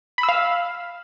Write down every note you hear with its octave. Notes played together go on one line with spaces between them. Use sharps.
B5
E6
F5